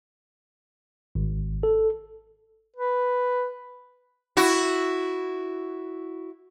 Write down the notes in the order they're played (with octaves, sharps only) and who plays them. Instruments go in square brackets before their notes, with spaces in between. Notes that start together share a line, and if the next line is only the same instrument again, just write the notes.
[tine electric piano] G#1
A4
[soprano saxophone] B4
[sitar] E4 F#4